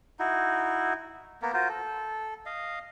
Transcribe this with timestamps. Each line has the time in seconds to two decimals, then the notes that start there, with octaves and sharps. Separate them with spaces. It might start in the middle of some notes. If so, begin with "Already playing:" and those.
0.19 D#4 E4 F#4
1.42 A#3 B3 A#4
1.54 F4 F#4 A#4 C5
1.69 A4
2.46 D#5 F5